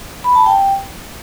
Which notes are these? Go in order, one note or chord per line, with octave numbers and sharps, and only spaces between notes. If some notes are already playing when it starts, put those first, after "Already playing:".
B5
A5
G5